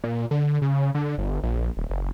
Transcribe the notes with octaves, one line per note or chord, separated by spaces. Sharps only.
A#2
D3
C#3
D3
G1
A#1
D#1
F#1